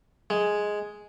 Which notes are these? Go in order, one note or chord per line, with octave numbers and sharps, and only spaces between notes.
G#3